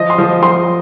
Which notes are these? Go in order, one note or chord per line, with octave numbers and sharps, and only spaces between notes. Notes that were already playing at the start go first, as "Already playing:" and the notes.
Already playing: F3 D#5
C6
F3
F3 C6